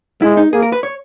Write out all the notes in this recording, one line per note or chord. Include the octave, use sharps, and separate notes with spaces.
G#3 E4
D#4
A#3 G#4
A#4
B4
C#5